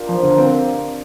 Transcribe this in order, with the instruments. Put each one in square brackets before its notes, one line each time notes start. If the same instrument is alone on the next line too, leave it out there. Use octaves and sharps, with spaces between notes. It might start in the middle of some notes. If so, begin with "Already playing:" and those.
Already playing: [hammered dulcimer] D4 F4 G4 A#4
[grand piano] F3 [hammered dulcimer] C5
[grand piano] D3
[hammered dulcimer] A#4
[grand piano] C4